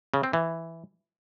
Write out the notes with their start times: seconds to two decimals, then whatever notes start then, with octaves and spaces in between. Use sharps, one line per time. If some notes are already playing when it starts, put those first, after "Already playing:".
0.14 C#3
0.23 C4
0.33 E3